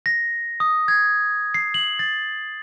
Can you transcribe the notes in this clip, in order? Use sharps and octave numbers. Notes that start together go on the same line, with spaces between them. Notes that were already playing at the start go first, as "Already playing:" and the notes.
A#6
D#6
G#6
C7
F#7
A6